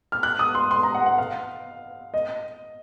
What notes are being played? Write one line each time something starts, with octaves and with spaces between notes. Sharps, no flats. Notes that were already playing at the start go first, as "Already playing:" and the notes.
F6
F#6
D#6
C6
C6
A#5
F#5
F#5
F5
D#5